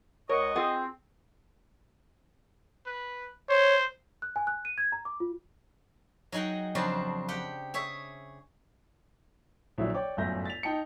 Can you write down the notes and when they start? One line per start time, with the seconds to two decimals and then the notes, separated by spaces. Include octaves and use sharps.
0.29 C#2 A#4 C#5 D#5 F#5 C#6
0.55 C4 F4 G#4 F#5
2.86 B4
3.49 C5 C#5
4.22 F#6
4.36 G#5
4.47 F#6
4.65 D#7
4.78 G#6
4.92 A#5
5.05 D6
5.20 F4
6.32 F#3 D#4 G#4 F#5 G5
6.75 F2 C#3 F#3 D4 C5 A5
7.28 G4 F#5 G5
7.74 G#4 C#5 E5
9.78 A#1 D3 F#3 E4 E5
9.94 C#5 D5 G5 D6
10.17 G1 F#2 A2 E5 G6 A#6
10.46 A6 B6 F7
10.63 D#4 G5 A5 C#7